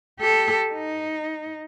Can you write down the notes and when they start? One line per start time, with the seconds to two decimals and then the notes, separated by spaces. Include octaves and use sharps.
0.20 G4 A4
0.73 D#4